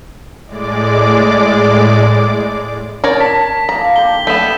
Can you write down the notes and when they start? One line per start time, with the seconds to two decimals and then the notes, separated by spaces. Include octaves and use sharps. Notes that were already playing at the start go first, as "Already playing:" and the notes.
0.46 A2 G#3 D5 D6
3.04 A#4 C#5 D5
3.20 A5 B6
3.69 A#3 D#4 F4 A#5
3.96 D3 G4 G7
4.27 A3 B3 E5 G6 B6 E7